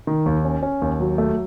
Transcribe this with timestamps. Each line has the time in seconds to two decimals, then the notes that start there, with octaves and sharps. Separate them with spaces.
0.07 D#3
0.26 D#2
0.45 C#4
0.63 C#4
0.82 D#2
1.00 F#3
1.18 A3